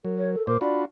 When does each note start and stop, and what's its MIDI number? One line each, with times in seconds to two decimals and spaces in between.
0.05 0.36 54
0.05 0.47 70
0.17 0.32 73
0.34 0.44 69
0.47 0.57 46
0.47 0.61 70
0.47 0.57 72
0.47 0.58 86
0.61 0.85 62
0.61 0.85 65
0.61 0.85 66
0.61 0.79 74
0.61 0.82 83